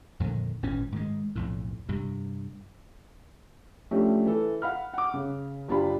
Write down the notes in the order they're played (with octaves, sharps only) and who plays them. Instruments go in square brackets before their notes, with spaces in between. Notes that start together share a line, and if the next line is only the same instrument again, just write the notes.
[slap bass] F2 A#2 D3 D#3
G#1 A#2 E3 C#4
G#2 D#3 G#3
B1 F2 A2
G2 C3
[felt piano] F3 A3 C#4 D4 G4
E3 A4
F5 F#5 B5 F6
F#5 D6
C#3
F#1 D4 F4 G4 B5